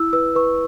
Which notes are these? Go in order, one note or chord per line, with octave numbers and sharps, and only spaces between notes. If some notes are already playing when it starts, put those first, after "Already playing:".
Already playing: E4 E6
B4 E6
B4 C#6